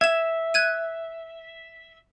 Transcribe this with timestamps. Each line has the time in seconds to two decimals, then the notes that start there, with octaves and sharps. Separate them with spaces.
0.01 E5 G#6 E7
0.54 F#6 G#6 D#7